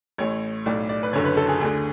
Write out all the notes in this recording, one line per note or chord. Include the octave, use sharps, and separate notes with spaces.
A1 A2 C#5
B1 A2 D5
D5
B4
F#1 F#2 D3 C#5
B4
A4
G#4
D2 D3 G#4